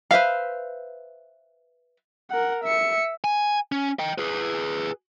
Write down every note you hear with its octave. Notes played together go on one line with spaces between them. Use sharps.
B4 C5 E5 F5
A#4 F#5
E5 C#7
G#5
C#4
D#5 G5
G#4 B4